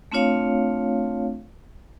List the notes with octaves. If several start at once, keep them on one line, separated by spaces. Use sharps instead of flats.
A3 C4 D4 F4 C#5 F5